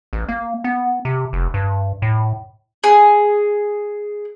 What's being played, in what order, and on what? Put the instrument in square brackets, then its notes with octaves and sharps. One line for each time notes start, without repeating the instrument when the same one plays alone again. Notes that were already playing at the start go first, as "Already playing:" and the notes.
[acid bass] A1
A#3
B3
C3
F1
G2
A2
[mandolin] G#4